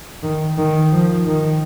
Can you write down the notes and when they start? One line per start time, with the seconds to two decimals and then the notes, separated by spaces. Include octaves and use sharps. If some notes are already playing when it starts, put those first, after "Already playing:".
0.23 D#3
0.58 D#3
0.93 F3
1.27 D#3